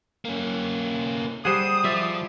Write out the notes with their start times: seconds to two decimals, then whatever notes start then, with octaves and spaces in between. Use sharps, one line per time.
0.25 A#3 C#4
1.45 G3 G#4 C5 F#5 D#6
1.84 F3 D5 E5